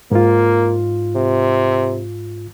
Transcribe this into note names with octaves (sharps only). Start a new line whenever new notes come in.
G#2 A#3 F4
C3